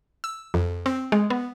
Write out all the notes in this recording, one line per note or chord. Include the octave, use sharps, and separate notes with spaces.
E6
F2
C4
G#3
B3